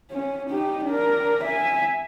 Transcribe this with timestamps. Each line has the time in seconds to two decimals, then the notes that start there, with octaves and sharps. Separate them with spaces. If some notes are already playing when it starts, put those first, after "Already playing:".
0.11 C#4
0.50 D#4 G4
0.85 D4 A#4
1.44 E5 G#5